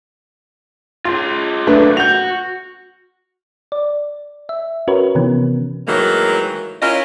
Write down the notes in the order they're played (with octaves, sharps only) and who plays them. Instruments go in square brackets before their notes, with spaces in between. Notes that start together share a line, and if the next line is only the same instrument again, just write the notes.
[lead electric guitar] F4 G#4 [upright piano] C6
[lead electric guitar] F#2 A#2 [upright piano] A3 D4 B4
[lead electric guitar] F#4 [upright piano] G6 F7
[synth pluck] D5
E5
C#4 F#4 A#4 B4 C#5
C3 D#3 E3 B3 C#4
[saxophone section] A2 D#3 E3 F#3 G#3 A#3
C#4 E4 F4 A#4 C#5 D#5